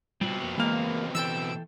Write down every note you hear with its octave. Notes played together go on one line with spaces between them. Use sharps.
B2 G3 C4 F4 F#4
F2 A#3 B3
E3 G#3 A#3 F5
E3 A4 G5 E6 D7